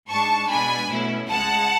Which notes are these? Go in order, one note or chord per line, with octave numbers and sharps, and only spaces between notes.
G#2 G#3 D4 A5 C#6
B2 G#3 D4 G#5 B5
B2 A3 C#4 E4
C#2 C#3 G#3 F#5 A5